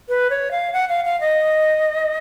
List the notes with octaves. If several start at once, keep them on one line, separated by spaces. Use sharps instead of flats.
B4
C#5
F5
F#5
F5
F5
D#5